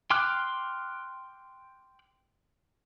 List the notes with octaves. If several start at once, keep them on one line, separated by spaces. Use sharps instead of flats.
G5 C6 D6 F6 F#6